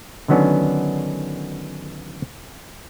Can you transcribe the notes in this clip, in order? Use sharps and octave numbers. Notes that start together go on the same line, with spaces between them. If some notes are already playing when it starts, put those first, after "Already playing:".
D3 D#3 F#3 B3 C#4 D4